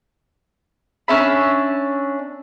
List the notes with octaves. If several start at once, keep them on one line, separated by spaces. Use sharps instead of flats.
C#4 D4 E5 B5